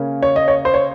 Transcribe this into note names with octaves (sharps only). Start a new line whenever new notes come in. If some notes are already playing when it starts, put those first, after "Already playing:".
Already playing: C#3 A#3 C#4
C#5
D#5
C#5
C5
C#5